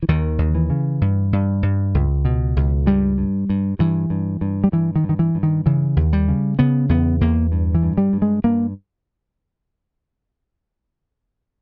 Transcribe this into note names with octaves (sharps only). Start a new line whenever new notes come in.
E3
D#2 D#3
D#2
E3
C#3
G2
G2
G2
C#2
B2
C#2
G2 G3
G2
G2
G2 E3
G2
G2
G3
G2 E3
D#3
G2
D#3
E3
G2
D#3
C#3 E3
D#2
G3
C#3
C#3 B3
E2 B3
E2 A#3
G2
E3
G2
G3
G2
G#3
G2 A#3